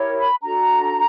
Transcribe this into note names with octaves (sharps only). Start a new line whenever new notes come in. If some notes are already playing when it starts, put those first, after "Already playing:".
Already playing: E4 G4 A#4 C#5
B5
D4 F#4 A4 A#5